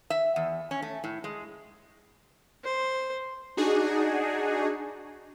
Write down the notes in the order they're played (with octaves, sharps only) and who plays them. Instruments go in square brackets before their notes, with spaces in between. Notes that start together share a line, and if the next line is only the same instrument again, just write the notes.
[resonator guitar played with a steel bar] E5
E2
C#4
A3
A2
G#3
[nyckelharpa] C5
[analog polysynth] D4 D#4 F#4 G#4